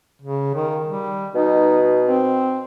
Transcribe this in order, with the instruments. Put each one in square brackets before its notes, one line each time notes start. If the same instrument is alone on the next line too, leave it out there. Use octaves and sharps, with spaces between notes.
[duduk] C#3
D#3
G3
[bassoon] B2 [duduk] D#4
[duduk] C4